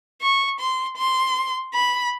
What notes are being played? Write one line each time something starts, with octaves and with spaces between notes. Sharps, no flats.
C#6
C6
C6
B5